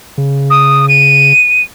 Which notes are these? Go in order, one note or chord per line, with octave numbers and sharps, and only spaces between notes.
C#3
D#6
D#7